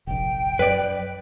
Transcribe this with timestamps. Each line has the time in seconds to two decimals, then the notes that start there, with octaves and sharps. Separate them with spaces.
0.07 F1 A#1 G5
0.59 F#2 B4 D5